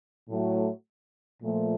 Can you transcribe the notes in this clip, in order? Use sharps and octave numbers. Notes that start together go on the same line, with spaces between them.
A2 F#3 A3
A#2 F3 A3